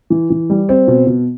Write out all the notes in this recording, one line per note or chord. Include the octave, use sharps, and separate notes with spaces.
E3
E3
G3
C4
B2
B2